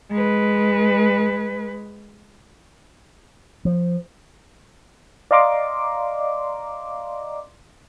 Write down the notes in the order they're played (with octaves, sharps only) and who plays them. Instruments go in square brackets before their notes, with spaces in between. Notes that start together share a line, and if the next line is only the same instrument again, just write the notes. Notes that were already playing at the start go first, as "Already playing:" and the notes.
[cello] G#3 B4
[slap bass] F3
[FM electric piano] D5 D#5 F5 A#5 C6 D6